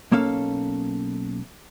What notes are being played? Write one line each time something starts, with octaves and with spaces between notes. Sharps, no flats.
B1 A#3 C#4 A4 F5